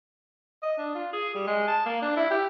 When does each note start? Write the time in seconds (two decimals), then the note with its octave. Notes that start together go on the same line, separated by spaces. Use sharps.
0.62 D#5
0.78 D4
0.95 F4
1.13 G#4
1.34 G3
1.47 G#3
1.67 A5
1.85 A#3
2.02 D4
2.16 E4
2.30 G4